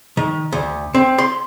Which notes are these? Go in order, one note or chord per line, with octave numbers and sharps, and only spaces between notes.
D#3
D2
C4
C6